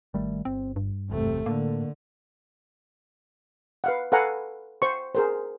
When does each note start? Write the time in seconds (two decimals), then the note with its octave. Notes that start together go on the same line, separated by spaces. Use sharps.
0.14 G#1 D#3 G3 A3
0.45 G1 C4
0.76 G2
1.10 G#1 E2 C3 A3
1.46 A2 D3 A#3
3.84 B4 F5 F#5
4.12 A4 B4 F5 F#5 G#5 A#5
4.82 C5 C#6
5.15 G#4 A#4 C5